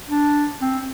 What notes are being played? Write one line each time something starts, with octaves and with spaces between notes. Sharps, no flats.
D4
C4